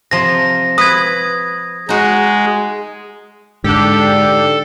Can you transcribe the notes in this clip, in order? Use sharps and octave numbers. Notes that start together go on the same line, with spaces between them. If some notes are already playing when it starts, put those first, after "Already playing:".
C3 F3 A#6
B4 D#6 G#6
G#3 D#4 F#4
G#2 D3 D4 G4 A4